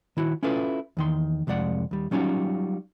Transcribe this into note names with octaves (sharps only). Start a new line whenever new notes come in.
D#3 E4 F#4
C#4 E4 F4 A4 B4
E2 D#3 C6
C2 F2 G#3 D5 F#5
D#2 G3
F#3 G3 C#4 D#4 F4 F#4